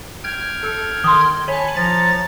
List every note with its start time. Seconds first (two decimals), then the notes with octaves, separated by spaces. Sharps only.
0.24 G5 F6 G#6
0.63 A4
1.04 D#3 C6 D#6 G7
1.48 C#5 G#5 A5 B5
1.76 F3 A#5 A6